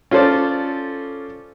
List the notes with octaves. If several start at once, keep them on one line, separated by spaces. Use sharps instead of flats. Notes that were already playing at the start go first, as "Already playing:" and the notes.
C#4 F4 A4 C5 D5